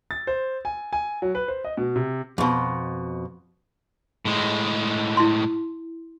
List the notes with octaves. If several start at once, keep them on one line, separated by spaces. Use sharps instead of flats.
A6
C5
G#5
G#5
F#3
B4
C5
D#5
B2
C3
F2 B2
A2 G#3
E4 C6